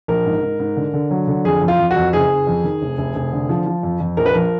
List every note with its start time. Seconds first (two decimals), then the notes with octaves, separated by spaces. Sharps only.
0.08 A#1 A#4
0.26 G#2
0.43 G#2
0.60 G#2
0.76 D3
0.94 D3
1.11 F#3
1.28 D3
1.45 F2 G#4
1.61 F2
1.68 F4
1.79 F2
1.91 F#4
1.96 F2
2.13 F#1 G#4
2.30 F#1
2.47 F2
2.64 D#3
2.82 F1
2.98 F1
3.15 F1
3.33 D3
3.49 F3
3.66 F3
3.83 F2
4.00 F2
4.17 A#1 A#4
4.26 B4
4.33 F3 A#4